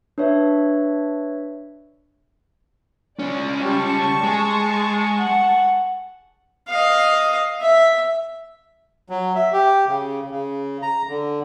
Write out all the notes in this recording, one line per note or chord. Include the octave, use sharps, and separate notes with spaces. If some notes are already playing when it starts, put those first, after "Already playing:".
D4 B4 C#5 E5
C#2 C#4 D5
G3 A5 C#6
G#3 G#4
F#5
D#5 F5
E5
F#3
E5
G4
C#3
C#3
A#5
D3